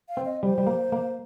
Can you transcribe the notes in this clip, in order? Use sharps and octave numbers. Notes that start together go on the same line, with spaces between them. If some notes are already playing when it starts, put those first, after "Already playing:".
F5
C4
D#5
G3 C5
G3
A#3
A#3